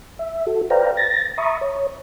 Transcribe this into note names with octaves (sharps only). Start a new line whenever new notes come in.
E5
F#4 A4
B4 C5 D5 F5 G5 A#5
A6 A#6
E5 A#5 B5 C#6 D#6
C#5